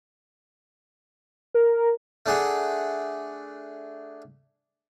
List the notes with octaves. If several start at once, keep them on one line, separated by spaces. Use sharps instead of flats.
A#4
A3 D4 G#4 F#5